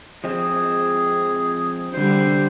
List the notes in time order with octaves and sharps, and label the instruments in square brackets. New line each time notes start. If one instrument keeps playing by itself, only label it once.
[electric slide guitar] F3 G#3 C4 [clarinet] G#4
[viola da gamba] D3 G3 [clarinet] C5